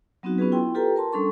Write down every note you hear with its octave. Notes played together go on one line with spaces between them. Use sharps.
F#3 B3 C4 D#4 F#4
B3 C#4 F4 F#4 G#4 B4
E4 G5 C6
F4 G4 A4 B4 G5 A#5
A#4 A5 C6
G3 C#4 D4 A4 C6 C#6